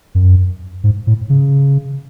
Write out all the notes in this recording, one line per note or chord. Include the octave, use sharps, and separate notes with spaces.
F#2
G#2
A2
C#3